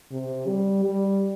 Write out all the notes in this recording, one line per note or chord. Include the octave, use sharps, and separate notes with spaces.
C3
G3
G3